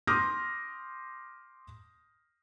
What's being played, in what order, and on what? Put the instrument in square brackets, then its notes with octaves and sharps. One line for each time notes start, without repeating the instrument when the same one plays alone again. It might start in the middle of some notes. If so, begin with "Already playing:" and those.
[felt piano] C6 D6 D#6 F6 G6 A#6